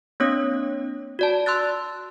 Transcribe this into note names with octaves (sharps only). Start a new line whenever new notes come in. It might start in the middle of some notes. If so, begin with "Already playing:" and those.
A#3 C4 D4 C#5 D#6
F#4 D5 A5
C6 E6 F#6 A6